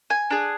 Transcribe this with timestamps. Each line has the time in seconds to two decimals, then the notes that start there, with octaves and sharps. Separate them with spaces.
0.10 G#5
0.31 D4 G#4